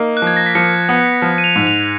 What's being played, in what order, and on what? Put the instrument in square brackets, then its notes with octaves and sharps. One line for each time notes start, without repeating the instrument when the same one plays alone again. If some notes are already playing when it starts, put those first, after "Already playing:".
Already playing: [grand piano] A#3 D#4
[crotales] F#6
[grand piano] F3
[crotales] G#6
A#6
B6
[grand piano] F3 [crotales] C#7
[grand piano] B3
F3
[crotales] D#7
F7
[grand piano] G#2
[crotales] F7